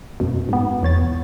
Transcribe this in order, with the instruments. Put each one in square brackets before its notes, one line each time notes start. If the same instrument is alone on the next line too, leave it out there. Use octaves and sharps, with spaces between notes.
[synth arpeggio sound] F#2 B2
G#2 B3
E2 C#5 A6